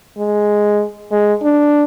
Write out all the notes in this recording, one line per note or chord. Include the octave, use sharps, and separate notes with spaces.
G#3
G#3
D4